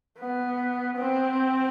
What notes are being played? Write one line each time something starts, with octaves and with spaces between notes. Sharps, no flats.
B3
C4